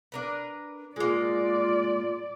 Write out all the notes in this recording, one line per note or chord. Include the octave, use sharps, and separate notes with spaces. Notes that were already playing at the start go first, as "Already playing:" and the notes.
D4 A#4 B4
G#3 A#3 F4 D5